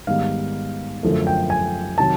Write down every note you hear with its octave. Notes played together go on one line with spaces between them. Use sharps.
G#2 D#3 G3 B3 F5
F#2 D3 F3 A3
G5
G#5
C3 D#3 F#3 A5